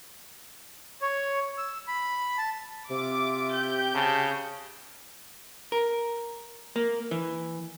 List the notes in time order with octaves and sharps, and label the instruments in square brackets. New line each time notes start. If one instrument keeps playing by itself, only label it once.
[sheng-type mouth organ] C#5
E6
B5
A5
[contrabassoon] C3 [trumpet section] F4 E5 [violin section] D6
[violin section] G4 G6
[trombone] C#3 [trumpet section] G#4 A5
[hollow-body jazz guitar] A#4
A#3
E3